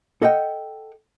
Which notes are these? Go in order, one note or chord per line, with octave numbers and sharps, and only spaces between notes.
A4 D#5 F#5 G5